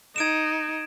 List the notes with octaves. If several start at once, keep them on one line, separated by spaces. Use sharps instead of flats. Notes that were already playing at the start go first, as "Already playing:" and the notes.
D#4 G#6 D7 E7